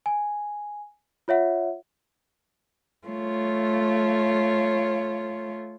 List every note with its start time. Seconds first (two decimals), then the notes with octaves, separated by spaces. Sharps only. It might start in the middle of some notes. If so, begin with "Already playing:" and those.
0.06 G#5
1.28 F4 C#5 E5 F#5
3.07 A3 F4 C#5